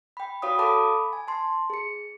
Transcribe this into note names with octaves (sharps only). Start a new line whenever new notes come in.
G5 B5
F#4 C#5 F5 B5 D#6
A4 F5 A5 B5 D6 D#6
G#5
A5 C6
G#4 C#7